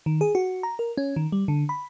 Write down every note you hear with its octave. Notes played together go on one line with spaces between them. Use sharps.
D#3
G#4
F#4
A#5
A#4
C#4
D#3
G3
D3
B5